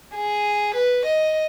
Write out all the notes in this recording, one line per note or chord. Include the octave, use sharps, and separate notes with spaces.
G#4
B4
D#5